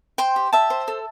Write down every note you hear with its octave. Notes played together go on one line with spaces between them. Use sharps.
C5 G5 C6
G4
G4 E5 A5
C5
A4